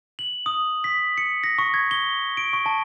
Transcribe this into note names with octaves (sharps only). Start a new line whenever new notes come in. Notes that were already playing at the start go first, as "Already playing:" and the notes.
F#7
D#6
B6
C#7
A#6
C#6
G#6
G7
D7
C#6
A5